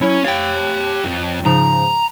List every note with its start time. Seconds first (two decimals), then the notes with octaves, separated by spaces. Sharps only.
0.01 F#3 C#4 E4 C#5
0.24 G4 C#5 F5 G5
1.04 F2
1.45 G#2 C#3 F3 A#5